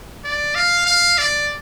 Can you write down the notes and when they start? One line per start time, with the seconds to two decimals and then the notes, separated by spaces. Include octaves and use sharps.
0.24 D5
0.55 F5
0.86 F5
1.18 D5